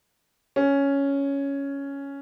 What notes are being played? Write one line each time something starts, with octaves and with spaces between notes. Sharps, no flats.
C#4